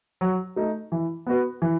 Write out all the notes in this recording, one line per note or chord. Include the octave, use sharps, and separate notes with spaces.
F#3
A3 D#4
E3
B3 F#4 B4
E3